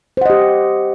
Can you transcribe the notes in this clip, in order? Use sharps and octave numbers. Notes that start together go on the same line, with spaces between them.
G4 C5 D#5 F#5